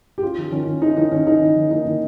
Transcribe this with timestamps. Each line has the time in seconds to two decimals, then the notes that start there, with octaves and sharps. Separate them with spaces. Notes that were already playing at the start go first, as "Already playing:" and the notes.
0.18 G4
0.23 C#4 F4
0.38 D#3
0.52 D#3 C#4
0.67 D#3
0.82 C#4 D#4
0.97 D#3 D#4
1.12 D#3 C#4
1.27 C#4 D#4
1.42 D#3
1.56 D#3
1.71 A#3 D#4
1.85 D#3